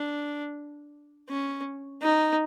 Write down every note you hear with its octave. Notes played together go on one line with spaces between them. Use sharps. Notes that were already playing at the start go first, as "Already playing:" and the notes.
Already playing: D4
C#4
D#4